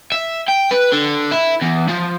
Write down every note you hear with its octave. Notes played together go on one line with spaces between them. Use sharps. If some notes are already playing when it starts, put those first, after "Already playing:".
E5
G5
B4
D3
E4
E2
F3